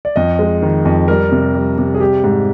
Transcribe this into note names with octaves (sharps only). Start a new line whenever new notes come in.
D5
F2 D#5
G#3
D#3
F2
G3 A#4
C3
G3
C3
G#4
G3 G4
G#2